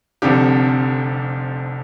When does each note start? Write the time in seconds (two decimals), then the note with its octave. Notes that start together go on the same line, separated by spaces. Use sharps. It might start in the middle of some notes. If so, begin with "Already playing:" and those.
0.22 F1 F2 D3 G4